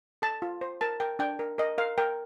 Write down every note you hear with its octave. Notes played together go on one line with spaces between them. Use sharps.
A4 A5
F4
C5
A#4 A5
A#4 G5
D4 G5
A#4
A#4 D#5
A#4 F5
A#4 G5